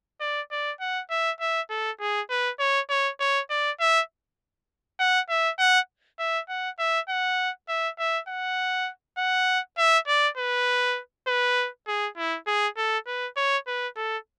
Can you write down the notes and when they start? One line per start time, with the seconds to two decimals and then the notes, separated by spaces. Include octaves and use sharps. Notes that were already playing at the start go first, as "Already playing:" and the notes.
0.21 D5
0.51 D5
0.81 F#5
1.10 E5
1.40 E5
1.70 A4
2.00 G#4
2.30 B4
2.60 C#5
2.90 C#5
3.20 C#5
3.50 D5
3.80 E5
4.99 F#5
5.29 E5
5.59 F#5
6.19 E5
6.49 F#5
6.79 E5
7.09 F#5
7.69 E5
7.99 E5
8.28 F#5
9.18 F#5
9.78 E5
10.07 D5
10.38 B4
11.27 B4
11.87 G#4
12.17 E4
12.47 G#4
12.77 A4
13.07 B4
13.37 C#5
13.67 B4
13.96 A4